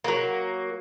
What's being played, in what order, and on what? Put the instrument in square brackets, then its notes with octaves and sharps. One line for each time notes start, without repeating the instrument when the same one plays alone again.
[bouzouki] F#3 A#3